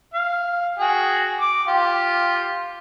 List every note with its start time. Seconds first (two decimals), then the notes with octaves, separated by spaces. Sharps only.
0.14 F5
0.79 F#4 G#4 G5
1.40 D6
1.68 F4 G4